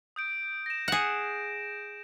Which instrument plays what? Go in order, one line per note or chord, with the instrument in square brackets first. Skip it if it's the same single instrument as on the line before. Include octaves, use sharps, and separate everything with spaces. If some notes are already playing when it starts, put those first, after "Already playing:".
[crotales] D#6 G6 D7
A#6 E7
[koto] G#4 F#5